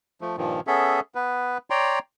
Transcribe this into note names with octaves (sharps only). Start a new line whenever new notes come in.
F3 A3
G2 A#2 D#3 F3
B3 C#4 G#4 A4 E5
B3 B4
C#5 D5 G5 A#5 C6